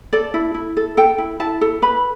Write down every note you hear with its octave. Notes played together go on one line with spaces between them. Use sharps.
A4 D5
E4
E4
A4
A4 G5
E4
E4 A5
A4
B4 B5